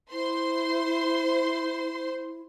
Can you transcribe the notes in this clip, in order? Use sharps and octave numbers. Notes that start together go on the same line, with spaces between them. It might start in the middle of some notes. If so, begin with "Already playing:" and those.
E4 C5 C6